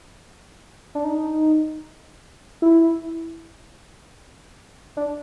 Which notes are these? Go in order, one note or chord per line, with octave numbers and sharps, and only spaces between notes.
D4
D#4
E4
D4